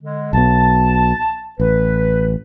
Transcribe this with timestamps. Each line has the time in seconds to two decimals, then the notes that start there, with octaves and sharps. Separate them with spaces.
0.03 D3 G#3
0.33 B1 B2 A5
1.60 A1 B4